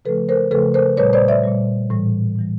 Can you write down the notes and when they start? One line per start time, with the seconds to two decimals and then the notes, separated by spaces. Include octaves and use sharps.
0.05 C#3 F3 A3 A4 B4
0.29 A#4 C5
0.51 C#3 F3 A3 A4 B4
0.74 A#4 C5
0.97 A#2 G3 B4 C#5
1.13 C5 D5
1.28 D5 E5
1.43 A#2 G3
1.90 A2 E3 G3
2.36 A2 E3 G3